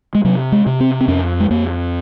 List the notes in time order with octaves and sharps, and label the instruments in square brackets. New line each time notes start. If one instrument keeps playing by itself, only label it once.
[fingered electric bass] G#3
C3 F#3
G#3
C3
C4
C4
F2 C#4
G#3
F2 A#3